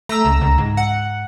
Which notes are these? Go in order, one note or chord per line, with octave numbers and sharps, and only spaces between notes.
A3 A#5 E6
C#2
C#2
G#2
F#5